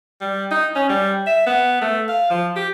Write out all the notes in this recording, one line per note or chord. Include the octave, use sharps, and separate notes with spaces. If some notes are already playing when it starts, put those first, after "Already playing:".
G3
D#4
C#4
G3
E5
B3
A3
F5
F3
G4